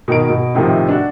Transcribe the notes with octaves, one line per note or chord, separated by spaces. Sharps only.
B2 D#3 A#4 D7
B2
A2 C3 D#3 F3 C4
D4 F#4